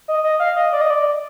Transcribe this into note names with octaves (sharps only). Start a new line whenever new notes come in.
D#5
D#5
F5
D#5
D5
D#5
D5